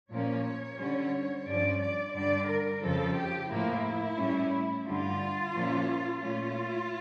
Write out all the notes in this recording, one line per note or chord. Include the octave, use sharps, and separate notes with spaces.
A#2 F3 A#3 C#4 C#5
D3 G3 C#4
G2 F3 C#4 D5
D5
G2 D3 G3 D4 D5
A#4
F2 C#3 F3 A4
G4
A2 F3 A#3 E4
A2 G3 C#4
G2 D3 G3 F4
A#2 F3 A#3 C#4
A#2 A3 C#4 F4